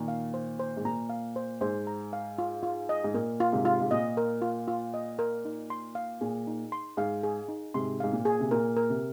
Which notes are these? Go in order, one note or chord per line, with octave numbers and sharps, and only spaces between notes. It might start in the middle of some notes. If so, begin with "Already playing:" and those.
Already playing: A#2 D#3 A#5
F5
C5
C5
G#2
A#2 A#5
F5
C5
G#2 C5
A#5
F5
F4
F4
D#5
G#2
A#2 A#4
F4
G#2 C3
F4
G#2
A#2 D#5
A#4
F4
F4
D#5
A#4
D#4
C6
F5
A#2 G#4
D#4
C6
G#2 F5
G#4
D#4
G#2 C3 C6
G#2 F5
A#2
G#4
C3
A#2 A#4
A#4
C3